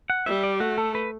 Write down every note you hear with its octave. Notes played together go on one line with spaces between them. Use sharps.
F#5
G3 E5
D5
A3 F#4
A4
B4